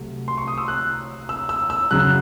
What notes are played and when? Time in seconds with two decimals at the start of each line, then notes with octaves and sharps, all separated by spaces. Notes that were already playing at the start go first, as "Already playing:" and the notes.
Already playing: C2 C3 F#3 A3
0.28 C6
0.38 C#6
0.48 D#6
0.58 E6
0.68 F#6
1.29 E6
1.49 E6
1.70 E6
1.91 F#2 C#3 F#3 F#6